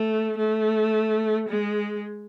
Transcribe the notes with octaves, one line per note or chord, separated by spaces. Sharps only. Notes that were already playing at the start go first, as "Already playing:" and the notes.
Already playing: A3
A3
G#3